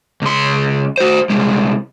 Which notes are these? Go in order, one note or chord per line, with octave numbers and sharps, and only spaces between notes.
C#2 C6
F#4 C5
C2 G#3